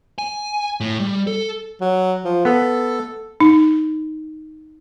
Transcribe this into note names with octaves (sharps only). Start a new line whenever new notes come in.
G#5
A2
G3
A4
F#3
F3
B3 A4
D#4